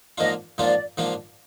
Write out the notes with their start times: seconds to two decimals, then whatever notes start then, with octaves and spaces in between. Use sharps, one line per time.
0.18 G#2 F3 A#3 D4 F4 D#5
0.58 G#2 F3 A#3 D4 F4 D5
0.98 G#2 F3 A#3 D4 F4